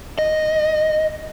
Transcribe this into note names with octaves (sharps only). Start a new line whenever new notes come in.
D#5